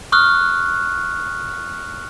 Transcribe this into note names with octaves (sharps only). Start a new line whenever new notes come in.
C#6 D#6 F6 F#6